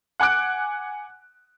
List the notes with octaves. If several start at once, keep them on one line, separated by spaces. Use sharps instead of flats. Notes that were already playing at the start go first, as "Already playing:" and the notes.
F#5 G#5 D6 F#6 D7